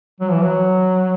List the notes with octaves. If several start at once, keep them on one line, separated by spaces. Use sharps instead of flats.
F#3
E3
F#3